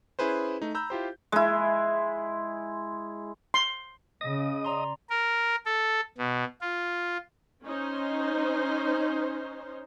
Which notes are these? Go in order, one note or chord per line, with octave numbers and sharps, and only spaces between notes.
C#4 E4 G#4 B4 C5
A3 D#4
A#5 B5 E6 G6
E4 F4 G4 C5
G#3 E4
C6
C#3 D#5 D#6
D5 A#5 C6
A#4
A4
B2
F4
C#4 D#4 C5